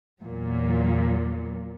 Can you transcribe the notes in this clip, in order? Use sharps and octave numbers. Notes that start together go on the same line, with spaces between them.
E2 A#2 F#3